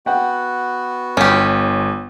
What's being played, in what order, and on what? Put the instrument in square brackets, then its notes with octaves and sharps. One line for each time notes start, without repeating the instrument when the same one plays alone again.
[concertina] B3 F#4 [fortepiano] F#5 G5
[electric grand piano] G1 [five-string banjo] C#4 G4